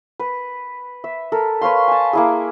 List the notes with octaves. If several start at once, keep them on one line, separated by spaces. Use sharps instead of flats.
B4
E5
A4 A#4
B4 C#5 F5 C6
G#5 A5
A#3 E4 G#4